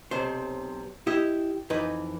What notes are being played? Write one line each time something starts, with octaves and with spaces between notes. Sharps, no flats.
B1 C3 C5
E4 G4 D#5
F2 E3 D#4 B4